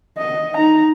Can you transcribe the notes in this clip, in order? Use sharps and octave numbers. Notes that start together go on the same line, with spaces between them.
D#5
D#4 A#5